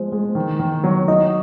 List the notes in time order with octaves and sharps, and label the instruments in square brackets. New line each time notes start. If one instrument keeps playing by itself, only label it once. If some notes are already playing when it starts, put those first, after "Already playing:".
Already playing: [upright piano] F3 G#3 [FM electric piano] C5
[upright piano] G#3
D#3
D#3
F#3
[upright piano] D#4 [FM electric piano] D#5